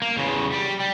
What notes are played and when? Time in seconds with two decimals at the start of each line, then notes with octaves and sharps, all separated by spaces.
0.02 A#3
0.17 E2 C#3
0.52 G3
0.80 G3